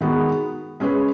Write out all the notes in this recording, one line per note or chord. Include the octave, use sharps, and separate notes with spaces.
D#3 G#3 B3 F#4
G#3 C#4 G#4 B4